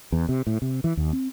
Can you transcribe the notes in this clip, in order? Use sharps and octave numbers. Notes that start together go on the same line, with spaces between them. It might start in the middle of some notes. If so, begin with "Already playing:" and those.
E2
C3
A2
C3
E3
D#2
C4